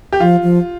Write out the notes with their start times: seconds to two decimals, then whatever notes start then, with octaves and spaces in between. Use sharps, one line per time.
0.13 G4
0.20 F3 F4
0.43 F3